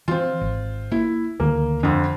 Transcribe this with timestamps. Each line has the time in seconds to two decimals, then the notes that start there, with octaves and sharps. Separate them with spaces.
0.08 E3 C4 F4
0.41 G#1
0.92 A#3 E4
1.40 D2 D#3 A#3
1.83 F2 D3